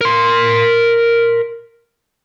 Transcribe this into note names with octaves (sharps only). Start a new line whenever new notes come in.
A#4 C6